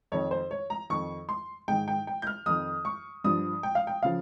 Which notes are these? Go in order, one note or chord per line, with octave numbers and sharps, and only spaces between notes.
F2 D#3 C#5
C5
C#5
A#5
F2 D#3 C#6
C6
G#2 D#3 G5
G5
G5
G6
F6
F2 D#3 D#6
C#6
G2 F3 D#6
G5
F5
G5
C#3 F3 F5